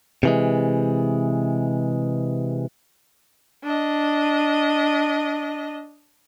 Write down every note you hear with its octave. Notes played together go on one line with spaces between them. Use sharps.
C3 E3 G#3
D4 D#5